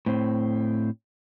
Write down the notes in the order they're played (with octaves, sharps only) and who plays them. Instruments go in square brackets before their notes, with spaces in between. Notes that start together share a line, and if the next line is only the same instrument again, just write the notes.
[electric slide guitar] A2 C4